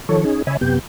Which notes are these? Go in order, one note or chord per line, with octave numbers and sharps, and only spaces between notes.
D#3 F3 A4 C#5
C#4 D#4 G#4
C#3 C#5 D#5 E5 G#5 B5
F#2 C3 B3 G4 G6